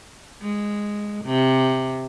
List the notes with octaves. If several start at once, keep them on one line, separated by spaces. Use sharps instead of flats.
G#3
C3